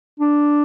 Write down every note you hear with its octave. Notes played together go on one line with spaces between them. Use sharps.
D4